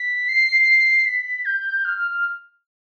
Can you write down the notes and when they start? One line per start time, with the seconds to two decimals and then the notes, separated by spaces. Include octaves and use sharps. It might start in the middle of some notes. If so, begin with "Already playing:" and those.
Already playing: B6
0.28 C7
1.05 B6
1.45 G6
1.84 F6
1.97 F6
2.10 F6